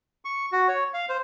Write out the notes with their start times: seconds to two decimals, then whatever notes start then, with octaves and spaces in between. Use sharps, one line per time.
0.25 C#6
0.52 F#4
0.68 C#5
0.94 F5
1.09 C5